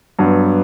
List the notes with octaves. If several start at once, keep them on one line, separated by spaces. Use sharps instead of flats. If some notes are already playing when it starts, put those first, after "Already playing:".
G2 F#3 B3